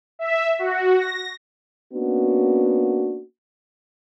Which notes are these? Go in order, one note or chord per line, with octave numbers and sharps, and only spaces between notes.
E5
F#4
A#6
A#3 B3 C#4 D4 F#4